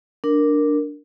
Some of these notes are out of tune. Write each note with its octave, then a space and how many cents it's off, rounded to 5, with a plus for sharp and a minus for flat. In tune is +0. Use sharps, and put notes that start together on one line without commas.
D4 +0 A#4 -5